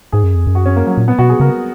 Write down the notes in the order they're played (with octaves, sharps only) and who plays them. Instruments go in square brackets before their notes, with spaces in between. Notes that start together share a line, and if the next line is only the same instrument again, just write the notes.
[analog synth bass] G#2 [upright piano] G#4
[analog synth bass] F#2
F2
F#2
[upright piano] F#4
C#4
A#3
F#3
[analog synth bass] A#2
[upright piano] B3
[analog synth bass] B2 [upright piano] F#4
[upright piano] G#4
[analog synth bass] C#3 [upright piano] A#4